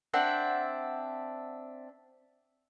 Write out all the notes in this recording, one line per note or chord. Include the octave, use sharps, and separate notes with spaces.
C4 D4 E5 F#5